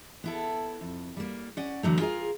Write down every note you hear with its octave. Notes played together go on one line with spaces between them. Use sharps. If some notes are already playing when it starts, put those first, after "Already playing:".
B3 E4 A4
F2
G3 A#3
C#4 D5 F#5
D3 E3 F#3 A3
F4 G#4 A#4 D5 F5